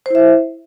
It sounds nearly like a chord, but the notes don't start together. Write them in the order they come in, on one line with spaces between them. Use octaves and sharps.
C5 E4 E5